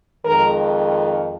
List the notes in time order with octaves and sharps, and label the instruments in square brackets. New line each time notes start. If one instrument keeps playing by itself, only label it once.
[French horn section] F2 D#3 G#3 A#4